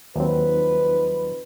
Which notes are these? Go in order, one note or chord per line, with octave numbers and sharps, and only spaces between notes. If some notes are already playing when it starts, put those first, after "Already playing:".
D#2 F3 F#3 C4 D#4 B4